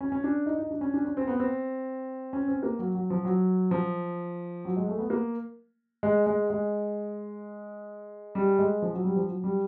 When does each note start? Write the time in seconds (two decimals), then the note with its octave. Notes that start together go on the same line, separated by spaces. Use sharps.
0.01 C#4
0.12 C#4
0.24 D4
0.46 D#4
0.59 D#4
0.71 D4
0.81 C#4
0.94 D4
1.04 C#4
1.17 C4
1.27 B3
1.40 C4
2.33 C#4
2.48 C4
2.63 A#3
2.79 F#3
2.95 F#3
3.10 F3
3.25 F#3
3.71 F3
4.65 F#3
4.77 G#3
4.88 A3
4.99 B3
5.10 A#3
6.03 G#3
6.26 G#3
6.50 G#3
8.35 G3
8.59 G#3
8.82 F3
8.93 F#3
9.04 G3
9.16 F3
9.28 F#3
9.44 G3